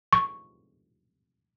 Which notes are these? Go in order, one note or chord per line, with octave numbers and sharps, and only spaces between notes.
C#6